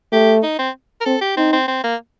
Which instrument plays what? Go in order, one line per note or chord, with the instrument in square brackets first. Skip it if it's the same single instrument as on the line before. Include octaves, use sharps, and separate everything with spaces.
[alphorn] A3 [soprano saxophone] G4
[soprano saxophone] D#4
C4
A#4
[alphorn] C4 [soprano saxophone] A4
[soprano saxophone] G4
[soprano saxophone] C4 [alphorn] D#4
[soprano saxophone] C4
C4
A#3